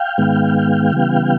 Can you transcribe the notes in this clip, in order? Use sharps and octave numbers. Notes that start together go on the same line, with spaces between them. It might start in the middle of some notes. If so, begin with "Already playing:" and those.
Already playing: F5 G5
G#2 D#3 G#3 B3
C#3 E3 G3 B3